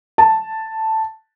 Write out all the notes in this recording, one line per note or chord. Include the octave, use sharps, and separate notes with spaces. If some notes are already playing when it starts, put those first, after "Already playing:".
A5